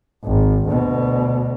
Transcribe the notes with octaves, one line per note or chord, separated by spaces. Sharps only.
G#1
D2 B2